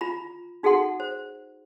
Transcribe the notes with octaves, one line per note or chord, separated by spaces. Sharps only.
F4 A#5 B5
D#4 F#4 G#4 A4 F#5 C6
C5